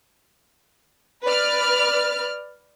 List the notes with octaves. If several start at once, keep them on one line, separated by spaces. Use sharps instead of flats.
B4 D5 F6